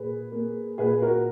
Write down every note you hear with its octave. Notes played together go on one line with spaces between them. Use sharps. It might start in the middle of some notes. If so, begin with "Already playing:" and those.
Already playing: A#2 A#3 G#4 B4
A#3
A#2 G#4 B4
F#4 A#4